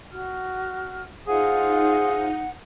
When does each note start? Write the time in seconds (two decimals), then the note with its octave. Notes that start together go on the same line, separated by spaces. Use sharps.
0.11 F#4 F6
1.28 D#4 F4 G#4 C5 F5 F#5